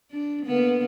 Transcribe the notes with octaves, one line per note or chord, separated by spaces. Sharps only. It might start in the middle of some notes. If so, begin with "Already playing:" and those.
D4
D3 A#3 B3